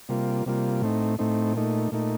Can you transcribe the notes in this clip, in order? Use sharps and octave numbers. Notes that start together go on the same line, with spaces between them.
C3 G3 A#3 F4
C3 G3 A#3 F4
A2 A3 C4 D#4
A2 A3 C4 D#4
A#2 A3 D#4
A#2 A3 D#4